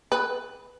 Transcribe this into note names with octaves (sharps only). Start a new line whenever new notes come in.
B4